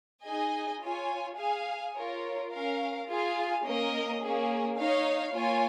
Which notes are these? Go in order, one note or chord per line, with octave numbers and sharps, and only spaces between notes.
D#4 G#4 D#5 G#5
F4 C#5 G#5
G#4 F5 G#5
F4 A#4 C#5
C#4 A#4 F5
F4 G#4 F5 G#5
A#3 C#4 A#4 D#5
A#3 C#4 G#4
D#4 C#5 F5
A#3 F4 C#5 G#5